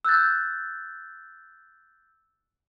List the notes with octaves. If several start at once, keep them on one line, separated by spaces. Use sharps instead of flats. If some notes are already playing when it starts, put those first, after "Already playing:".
E6 F#6 G6 A6